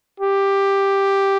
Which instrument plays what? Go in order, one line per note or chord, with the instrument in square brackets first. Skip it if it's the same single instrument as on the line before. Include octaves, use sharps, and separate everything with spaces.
[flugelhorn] G4